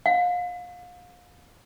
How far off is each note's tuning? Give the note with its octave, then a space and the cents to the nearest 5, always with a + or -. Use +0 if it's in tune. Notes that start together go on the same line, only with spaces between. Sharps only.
F5 +35